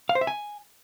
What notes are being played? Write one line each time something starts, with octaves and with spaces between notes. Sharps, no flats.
F5
C5
E5
G#5